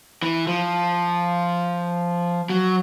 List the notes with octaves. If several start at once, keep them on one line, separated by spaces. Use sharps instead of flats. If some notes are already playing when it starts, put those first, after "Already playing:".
E3
F3
F#3